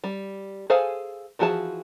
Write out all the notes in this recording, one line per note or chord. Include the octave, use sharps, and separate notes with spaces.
G3
G#4 A4 C5 F5 G#5
E3 F3 F#4 G#4 A5